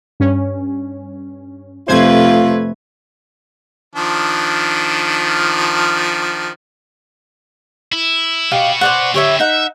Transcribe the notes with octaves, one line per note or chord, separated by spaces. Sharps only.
G2 C#4
F2 C3 A3 F4 B4 C5 G#6
D#3 F3 D4
E4
B2 F#4 G4 D#5 F5
C5 D5 F#5
D3 E4 G4 C#5 E5
D#4 E5 F#5